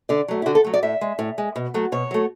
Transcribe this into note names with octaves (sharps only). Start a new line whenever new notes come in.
D3 D5
F#3 A3
E4
D3 F#4
A4
F#3 A3
D5
A2 E5
G#3
A2
G#3
B2
F#3 A3
B2 C#5
F#3 A3